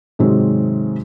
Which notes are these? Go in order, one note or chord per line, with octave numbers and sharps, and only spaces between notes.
G#2 C3 D#3 F#3 G#3 C4